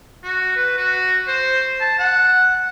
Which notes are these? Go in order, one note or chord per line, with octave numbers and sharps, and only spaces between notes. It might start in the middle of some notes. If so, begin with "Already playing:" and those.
F#4
B4
F#4
C5
A5
F#5